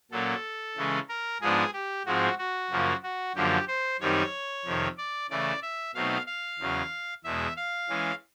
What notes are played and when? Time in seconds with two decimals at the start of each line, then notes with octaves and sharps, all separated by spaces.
0.12 A#2 F#3 A#3 C#4 A4
0.77 C#3 E3 G#3 C#4
1.09 A#4
1.41 G#2 F3 G#3 B3 D4 G#4
1.73 G4
2.06 G#2 F3 G#3 C4 F#4
2.38 F#4
2.71 F#2 C#3 F3 A#3
3.03 F#4
3.35 F#2 D3 F3 A#3 G4
3.68 C5
4.00 F#2 D#3 G3 C4 D#4 C#5
4.65 F2 C3 D#3
4.98 D5
5.30 C#3 E3 A3 D5
5.62 E5
5.94 B2 F#3 A3 C4 D#4 F5
6.27 F5
6.59 E2 C#3 F#3
7.24 E2 B2 G#3 E5
7.57 F5
7.89 E3 G#3 C#4